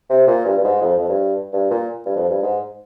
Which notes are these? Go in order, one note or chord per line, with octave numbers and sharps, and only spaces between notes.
C3
A#2
G2
G2
G#2
F2
F2
G2
G2
A#2
G2
F2
G2
G#2